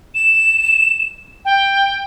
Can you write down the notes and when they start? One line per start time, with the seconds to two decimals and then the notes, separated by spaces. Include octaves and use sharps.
0.15 E7
1.45 G5